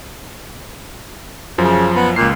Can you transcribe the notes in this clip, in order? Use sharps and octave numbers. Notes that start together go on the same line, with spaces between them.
F#2 C#3 F3
B3
C#2 A#2 C7